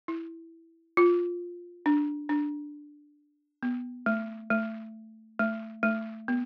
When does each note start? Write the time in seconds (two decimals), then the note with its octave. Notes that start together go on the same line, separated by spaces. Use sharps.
0.08 E4
0.97 F4
1.86 D4
2.29 D4
3.63 B3
4.06 A3
4.50 A3
5.39 A3
5.83 A3
6.28 B3